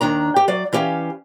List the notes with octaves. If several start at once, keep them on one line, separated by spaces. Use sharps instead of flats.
D#2 D#3 D4 A#5
G4
F#3 D5
E3 C#4 G4 F5